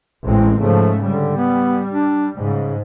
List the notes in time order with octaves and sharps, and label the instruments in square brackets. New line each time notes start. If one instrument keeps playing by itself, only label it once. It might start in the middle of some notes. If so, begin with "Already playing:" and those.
[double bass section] A1 G#3 C4
[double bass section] G#2 C#3 A3 [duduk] F3
[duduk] D3 [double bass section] G3
[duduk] B3
D4
[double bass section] G#2 [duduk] C#3